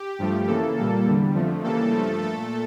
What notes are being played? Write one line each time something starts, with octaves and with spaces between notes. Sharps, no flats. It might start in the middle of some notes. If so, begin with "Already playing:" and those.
Already playing: G4
G2 F3 A3
C#3 E3 A#3 A4
A#2 G3 A#3 A4
E2 D3 G3
F2 D3 F3 A3
C#3 E3 G3 A#3 A4
G2 F3 A3
A#2 A3 A4